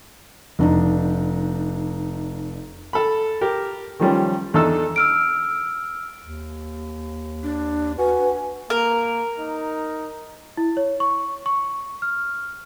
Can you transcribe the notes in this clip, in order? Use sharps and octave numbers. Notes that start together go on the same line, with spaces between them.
F1 D4 D#4
A4 B5
G4 A#4
D#3 F3 G3 C#4
E2 D4 D#4 A4 E6
E6 F6 D7
D#2
D4
F#4 B4 G#5
A#3 A#4
D#4
E4
C#5
C#6
C#6
F6